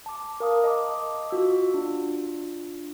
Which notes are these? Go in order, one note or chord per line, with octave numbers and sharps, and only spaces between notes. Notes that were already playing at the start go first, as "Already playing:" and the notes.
A5 D6
A#4 F5 D#6
D#5 A5 D6
F4 F#4 E6
D4 F4